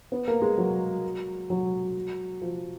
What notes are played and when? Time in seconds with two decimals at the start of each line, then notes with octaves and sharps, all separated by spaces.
0.12 B3
0.28 A#3
0.42 G#3
0.58 F#3
1.50 F#3
2.41 F3